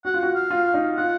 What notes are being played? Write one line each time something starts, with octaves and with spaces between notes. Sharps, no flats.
F#4 F#5
F4
F#4 F#5
F5
F4
D#4
F4 F#5